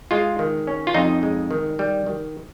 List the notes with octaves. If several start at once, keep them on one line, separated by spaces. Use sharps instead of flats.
G#3 F4
D#3
C#4
F4
F2 D#4
G#3
D#3
G3
D#3